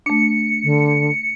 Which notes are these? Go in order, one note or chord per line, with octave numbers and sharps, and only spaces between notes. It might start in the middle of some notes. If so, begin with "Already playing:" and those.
A3 D4 C#7
D3